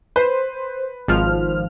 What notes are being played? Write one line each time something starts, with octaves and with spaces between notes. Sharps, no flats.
B4 C5
G#1 F3 F6